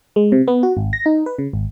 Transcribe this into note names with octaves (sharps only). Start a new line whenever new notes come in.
G#3
C3
B3
F#4
G#1
A#6
D#4
B4
C#3
G#1